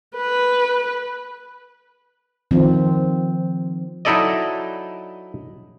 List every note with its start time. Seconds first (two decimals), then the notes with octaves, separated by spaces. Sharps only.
0.17 B4
2.51 D#3 F3 C4
4.05 F#3 D#4 E4 A4 D5 D#5